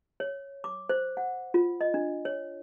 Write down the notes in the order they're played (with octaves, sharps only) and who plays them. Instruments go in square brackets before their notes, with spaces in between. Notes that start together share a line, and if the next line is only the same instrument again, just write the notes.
[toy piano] C#5
D6
C5
F#5
F4
D#5
D4
C#5